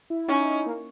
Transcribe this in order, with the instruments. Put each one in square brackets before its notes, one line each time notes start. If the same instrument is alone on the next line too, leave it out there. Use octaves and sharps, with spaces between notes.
[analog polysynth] E4
[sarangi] C#4 [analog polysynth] D#4
[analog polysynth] A#3